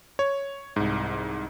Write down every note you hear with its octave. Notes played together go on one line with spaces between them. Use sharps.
C#5
C2 G#2